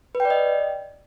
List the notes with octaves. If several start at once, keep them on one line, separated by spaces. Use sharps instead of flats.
B4
G5
D5
D#5